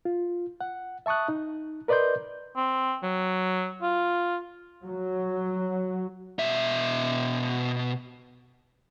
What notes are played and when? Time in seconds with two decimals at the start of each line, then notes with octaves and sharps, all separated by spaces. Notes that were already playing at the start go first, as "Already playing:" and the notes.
0.05 F4
0.61 F#5
1.06 E5 A5 C#6 D#6 F#6
1.28 D#4
1.88 A#4 B4 D5 D#5 C6 G6
2.56 C4
3.03 F#3
3.82 F4
4.86 F#3
6.39 B2 E5